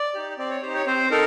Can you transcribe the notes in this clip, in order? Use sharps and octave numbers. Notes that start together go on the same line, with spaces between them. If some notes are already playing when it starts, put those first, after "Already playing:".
Already playing: D5
D#4 G4
C4 D5
C#5
D#4 G4 C5
C#5
C4 C5
D#4 A4 A#4